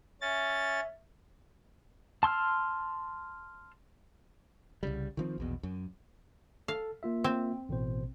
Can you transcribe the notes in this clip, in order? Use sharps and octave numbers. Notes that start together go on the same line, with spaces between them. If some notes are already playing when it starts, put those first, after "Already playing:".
C#4 E5 A6
A5 C6 E6 F6
C2 C#3 G3
D#3 F3 C4
A#1 E2 B2
F#2
A4 F5
A#3 F4 E5
C4
A1 B2 C5